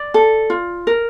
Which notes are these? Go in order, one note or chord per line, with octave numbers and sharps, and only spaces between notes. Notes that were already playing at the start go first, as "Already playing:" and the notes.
Already playing: D5
A4
F4
A#4